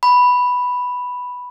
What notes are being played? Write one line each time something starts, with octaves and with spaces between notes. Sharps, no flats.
B5